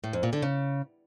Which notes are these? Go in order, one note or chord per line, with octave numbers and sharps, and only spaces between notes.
A2
F2
A#2
D3
C#3